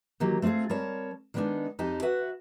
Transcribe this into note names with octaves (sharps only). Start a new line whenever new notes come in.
D#3 E3 F#3 A#3 G4
A3 C4 D#4 F4 G#4
G3 C4 A#4 C#5 A5
D#3 G#3 B3 C4 D4 D#4
F2 D#4 G4 G#4 A5
F#4 B4 E5 F#5